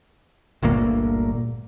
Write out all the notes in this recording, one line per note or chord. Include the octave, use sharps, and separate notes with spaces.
G1 D2 A#2 A#3